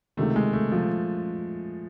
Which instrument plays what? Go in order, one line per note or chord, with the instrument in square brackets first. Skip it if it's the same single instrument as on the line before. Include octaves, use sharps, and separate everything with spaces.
[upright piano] C#2 C3 D#3 [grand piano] A3
[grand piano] G#3
A3
F3